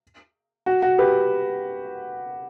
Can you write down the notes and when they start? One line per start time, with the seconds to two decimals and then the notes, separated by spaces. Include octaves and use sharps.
0.66 F#4
0.82 F#4
0.98 G4 B4